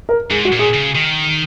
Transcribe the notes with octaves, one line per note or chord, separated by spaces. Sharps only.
A#4
G#2 G#4
F#4
A#2
G#4
C#3
D#3